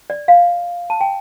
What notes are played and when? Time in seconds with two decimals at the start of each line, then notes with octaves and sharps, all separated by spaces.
0.10 D5
0.28 F5
0.90 A5
1.01 G5